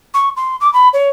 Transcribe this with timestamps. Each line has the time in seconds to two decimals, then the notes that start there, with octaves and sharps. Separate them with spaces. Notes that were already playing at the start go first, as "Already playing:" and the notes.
0.14 C#6
0.37 C6
0.61 D6
0.73 B5
0.93 C#5